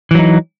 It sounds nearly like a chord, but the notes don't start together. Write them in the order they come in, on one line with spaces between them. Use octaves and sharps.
E3 F#3 D#4